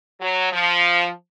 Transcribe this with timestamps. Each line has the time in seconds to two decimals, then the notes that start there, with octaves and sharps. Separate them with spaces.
0.21 F#3
0.52 F3